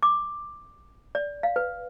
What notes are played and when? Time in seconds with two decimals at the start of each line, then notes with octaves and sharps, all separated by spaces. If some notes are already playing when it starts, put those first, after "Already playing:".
0.03 D6
1.15 D5
1.43 F5
1.56 B4